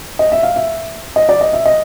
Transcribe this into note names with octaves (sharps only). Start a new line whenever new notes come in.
D#5
E5
F5
E5
D#5
D5
D#5
E5
D#5